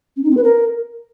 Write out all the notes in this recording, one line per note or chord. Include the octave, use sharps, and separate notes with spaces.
C#4
D#4
C4
B4
A#4